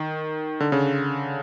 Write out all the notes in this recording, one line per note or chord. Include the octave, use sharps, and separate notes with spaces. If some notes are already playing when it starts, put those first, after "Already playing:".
Already playing: D#3
D3
C#3